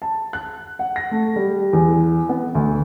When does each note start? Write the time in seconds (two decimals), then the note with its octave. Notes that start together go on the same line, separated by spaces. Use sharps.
0.02 A5
0.33 F#6
0.79 F#5
0.96 A#6
1.11 A3
1.36 G3
1.73 E2
2.29 B3
2.55 D2